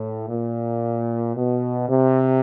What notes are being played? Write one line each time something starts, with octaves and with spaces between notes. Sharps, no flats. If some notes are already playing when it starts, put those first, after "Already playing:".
Already playing: A2
A#2
B2
C3